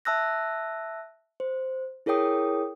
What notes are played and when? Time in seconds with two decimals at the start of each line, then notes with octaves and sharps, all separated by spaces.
0.05 E5 A5 E6 F#6 A#6
1.40 C5
2.06 E4 G#4 A#4 C#5 G5 D#6